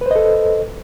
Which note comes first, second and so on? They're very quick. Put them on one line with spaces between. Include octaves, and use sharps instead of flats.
B4 C5 D#5 A4